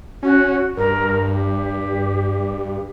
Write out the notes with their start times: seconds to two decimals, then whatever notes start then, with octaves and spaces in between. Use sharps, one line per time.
0.23 C#4 F#4
0.77 G2 A#4
1.29 G4